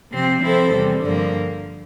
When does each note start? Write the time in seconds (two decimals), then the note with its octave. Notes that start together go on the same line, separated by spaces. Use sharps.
0.12 C3 F3 C4
0.43 F3 C4 E4 A4 C5
0.73 E2 C3 G3
1.04 G2 D3 F3 A#3